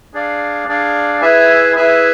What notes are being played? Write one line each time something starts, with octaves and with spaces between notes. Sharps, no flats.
D4 G#4 D5 F5
D4 G#4 D5 F5
E4 G#4 B4 E5 G#5
E4 G#4 B4 E5 G#5